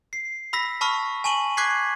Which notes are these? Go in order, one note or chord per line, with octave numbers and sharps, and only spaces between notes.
C7
B5 E6 A#6 B6
A5 B5 C#6 E6 F6
G#5 A5 C#6 D#7 F#7
C#6 D6 F#6 G#6 B6 C7